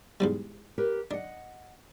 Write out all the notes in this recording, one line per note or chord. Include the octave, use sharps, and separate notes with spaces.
E2 G#2 G3
G4 A#4 B4
D4 D#5 F#5